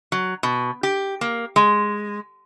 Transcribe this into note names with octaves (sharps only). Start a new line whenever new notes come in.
F#3
B2
G4
A#3
G#3